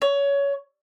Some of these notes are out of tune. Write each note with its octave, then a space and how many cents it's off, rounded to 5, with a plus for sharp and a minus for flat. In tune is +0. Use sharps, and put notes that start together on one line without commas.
C#5 +20